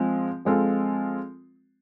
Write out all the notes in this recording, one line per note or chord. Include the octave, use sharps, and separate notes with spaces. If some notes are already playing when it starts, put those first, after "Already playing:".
Already playing: F3 G#3 C4
F3 G#3 C4 F4 A4